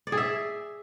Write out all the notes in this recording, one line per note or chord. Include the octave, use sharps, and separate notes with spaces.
D5
G#4
E5